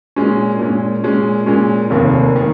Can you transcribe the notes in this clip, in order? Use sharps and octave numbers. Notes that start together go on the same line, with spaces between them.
A#2 G#3 C#4
A#2 G#3 C#4
A#2 G#3 C#4
A#2 G#3 C#4
F1 D#2 D#3 A#3
D#3 A#3